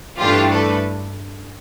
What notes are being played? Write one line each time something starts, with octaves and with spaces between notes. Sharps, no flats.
G2 E3 A3 D4 F4 G4
A4 B4